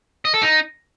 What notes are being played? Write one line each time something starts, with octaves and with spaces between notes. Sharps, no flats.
D#5
A4
D#4